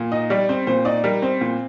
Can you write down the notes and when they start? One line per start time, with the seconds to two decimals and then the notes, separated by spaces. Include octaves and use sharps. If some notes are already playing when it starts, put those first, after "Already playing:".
Already playing: A#2
0.12 D#4 D#5
0.30 G3 D5
0.49 C4 C5
0.67 A#2 C5
0.85 D#4 D5
1.04 G3 A#4
1.22 C4 C5
1.41 A#2